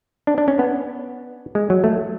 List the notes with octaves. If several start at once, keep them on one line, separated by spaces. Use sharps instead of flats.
D4
D4
C#4
B3
G#3
F#3
A3